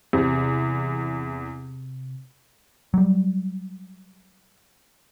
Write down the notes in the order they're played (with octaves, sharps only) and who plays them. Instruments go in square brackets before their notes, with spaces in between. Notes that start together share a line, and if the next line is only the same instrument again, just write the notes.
[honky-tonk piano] E2 [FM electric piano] C3
[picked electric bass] F#3 G3